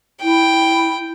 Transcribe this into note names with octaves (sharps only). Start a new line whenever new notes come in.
E4 G5